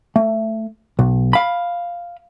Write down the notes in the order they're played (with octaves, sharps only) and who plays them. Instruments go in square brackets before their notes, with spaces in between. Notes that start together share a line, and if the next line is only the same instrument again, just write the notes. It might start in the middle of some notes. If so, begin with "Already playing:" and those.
[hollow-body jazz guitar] A3
B1
F5 B5